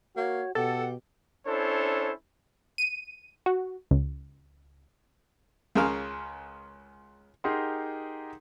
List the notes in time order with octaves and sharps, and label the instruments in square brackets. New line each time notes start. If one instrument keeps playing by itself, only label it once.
[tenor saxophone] A#3 [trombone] F#4 [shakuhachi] C#5
[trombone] B2 [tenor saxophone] G4 [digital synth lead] A4 [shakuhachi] F#5
[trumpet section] C#4 D4 E4 A4 C5 C#5
[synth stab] D#7
F#4
C#2
[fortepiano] C#2 C#3 A#4 F5
[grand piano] D#4 G4 G#4 A#4 F#5 C6